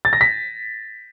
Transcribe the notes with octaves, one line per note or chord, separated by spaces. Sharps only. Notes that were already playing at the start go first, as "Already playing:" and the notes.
A6
A#6
B6